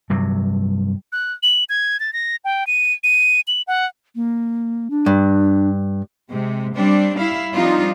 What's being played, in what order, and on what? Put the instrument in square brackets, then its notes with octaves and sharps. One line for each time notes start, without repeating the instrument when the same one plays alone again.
[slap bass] G2 C3 F#3
[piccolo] F#6
F#7
G#6
A6
A#6
G5
D#7
D#7
F#7
F#5
[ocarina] A#3
D4
[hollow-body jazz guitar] G2
[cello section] C3 G#3
G3 C4 D4
G3 E4 F5
F3 G3 C4 D4 D#4 F4